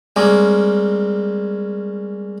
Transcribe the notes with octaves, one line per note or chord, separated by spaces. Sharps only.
G3 G#3 A#3 C4 C#4 A#4